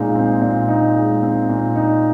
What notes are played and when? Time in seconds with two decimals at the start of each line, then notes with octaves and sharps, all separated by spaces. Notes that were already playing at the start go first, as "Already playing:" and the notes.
Already playing: A#2 G#3 C4 D#4
0.15 C4
0.42 A#2
0.68 D#4
0.95 G#3
1.23 C4
1.49 A#2
1.75 D#4